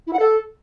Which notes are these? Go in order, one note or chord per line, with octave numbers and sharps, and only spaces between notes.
E4
F#5
A4